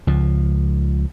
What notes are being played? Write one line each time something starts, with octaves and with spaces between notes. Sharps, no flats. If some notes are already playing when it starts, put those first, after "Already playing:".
C#2 F3